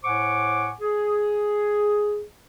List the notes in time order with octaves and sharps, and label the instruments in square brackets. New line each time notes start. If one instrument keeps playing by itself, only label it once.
[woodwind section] A2 C5 F#5 G#5 C#6 D6
G#4